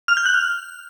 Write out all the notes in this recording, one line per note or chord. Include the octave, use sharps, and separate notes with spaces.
F6
G6
F#6
F6